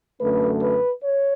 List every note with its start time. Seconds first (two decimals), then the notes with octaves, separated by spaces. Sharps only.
0.20 F#2 D3 A3 C#4 B4
0.61 B4
1.03 C#5